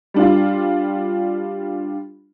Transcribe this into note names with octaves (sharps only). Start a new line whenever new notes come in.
G3 D4 F4